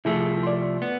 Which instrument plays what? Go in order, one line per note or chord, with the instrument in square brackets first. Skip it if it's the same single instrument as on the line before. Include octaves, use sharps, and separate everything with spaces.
[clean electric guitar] C2 F3 A3 [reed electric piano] E4 G#4 A4
[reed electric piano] D5 C6
[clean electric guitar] B3